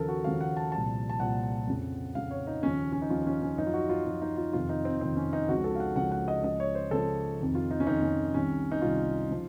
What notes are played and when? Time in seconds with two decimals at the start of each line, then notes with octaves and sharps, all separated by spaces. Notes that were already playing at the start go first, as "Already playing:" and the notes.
Already playing: D#2 C#3 F3 A4 A#4
0.08 F#4
0.24 D#2 C#3 F3 F5
0.41 F#5
0.57 A5
0.72 C2 A#2 F3 A5
1.10 A5
1.19 C2 A#2 F3 F#5
1.67 F2 C#3 F3
2.15 F2 C#3 F3 F5
2.31 C#5
2.47 D#4
2.63 D#2 C#3 F3 C#4
2.92 C#4
3.02 D#4
3.10 D#2 C#3 F3 F4
3.26 C#4
3.42 C#4
3.58 F#2 F3 D#4
3.67 F4
3.74 F#4
3.89 F4
4.06 F#2 F3 F#4
4.22 D#4
4.37 F4
4.53 F2 C3 D#3 F4
4.69 D#4
4.85 C4
5.01 F2 C3 D#3 C4
5.17 C#4
5.33 D#4
5.49 C#2 C#3 F3 F#4
5.64 A4
5.76 F5
5.80 F#5
5.96 C#2 C#3 F3 F#5
6.12 F#5
6.28 D#5
6.44 C#2 C#3 F3 D#5
6.60 C#5
6.75 C5
6.91 C#2 C#3 F3 A4
7.40 F2 C3 D#3
7.55 F4
7.71 D#4
7.80 C#4
7.87 F2 C3 D#3 D#4
8.02 C#4
8.34 C2 C3 D#3 C#4
8.72 D#4
8.82 C2 C3 D#3 F4
9.30 C#3 F3